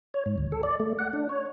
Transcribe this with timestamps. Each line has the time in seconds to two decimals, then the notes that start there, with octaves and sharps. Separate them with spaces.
0.14 C#5
0.26 G#2
0.38 D2
0.52 A4
0.63 D5
0.80 A3
0.99 F#5
1.13 D4
1.29 C#5